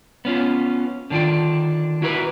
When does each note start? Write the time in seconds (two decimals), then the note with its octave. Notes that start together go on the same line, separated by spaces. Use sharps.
0.25 B3 C#4 F4
1.10 D3 D#3 D4 F4 G5
2.02 E4 F#4 A#4 B4